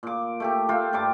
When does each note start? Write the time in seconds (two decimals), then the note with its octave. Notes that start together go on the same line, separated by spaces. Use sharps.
0.03 A#2 D6
0.40 A3 G4 A4
0.69 A3 F4 A4 G5
0.93 G2 G3 D6